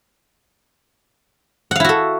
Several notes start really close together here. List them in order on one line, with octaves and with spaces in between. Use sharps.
F#5 F5 E4 F#4 A4